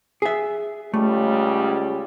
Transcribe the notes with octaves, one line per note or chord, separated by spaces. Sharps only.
G#4 E5
C#2 C#3 G3 A3